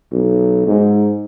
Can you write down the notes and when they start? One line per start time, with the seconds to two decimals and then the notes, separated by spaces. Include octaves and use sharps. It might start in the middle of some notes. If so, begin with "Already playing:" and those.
0.13 B1
0.67 G#2